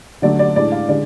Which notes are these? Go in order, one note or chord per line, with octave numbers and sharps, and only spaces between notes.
D3 F#3 A3 D5
D5
A2 G#3 D4 D5
F5
D3 G#3 D5